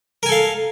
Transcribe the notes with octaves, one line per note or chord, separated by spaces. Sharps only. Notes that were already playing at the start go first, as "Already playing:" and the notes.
A4 A#4 F5 G#5